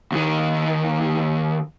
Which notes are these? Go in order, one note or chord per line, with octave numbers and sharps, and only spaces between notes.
D#2 D#3